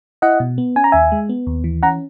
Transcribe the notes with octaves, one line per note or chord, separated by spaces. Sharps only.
E4 D#5 F#5
B2
B3
C#4 G#5
A#5
D#2 E5 G#5
G#3
B3
D#2
E3
C#4 F#5 A#5